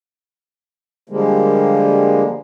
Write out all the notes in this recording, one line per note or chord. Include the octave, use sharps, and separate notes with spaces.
D3 F3 G3 G#3 A#3